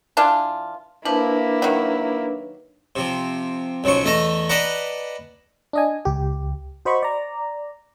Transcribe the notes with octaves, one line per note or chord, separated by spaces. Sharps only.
E3 D4 F4
F3 A#3 D4 E4 B4
D#3 F#3
C3 F3
B1 C#3 F3 F#3 C#6
E2 A3 D#5 A5 A#5
B4 D5 D#5 F#5 A5 A#5
D4 D#5 G#5
C#2 G4
F#4 C5 D#5 B5 C#6
D5 A#5